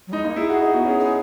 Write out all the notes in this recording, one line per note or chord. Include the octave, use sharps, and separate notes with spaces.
F#3
G#3 D#4
A#3 D#4
E4 G#4
F#4 G#4
D#4 G#4
B3 F#4
C#4 G#4
D#4 G#4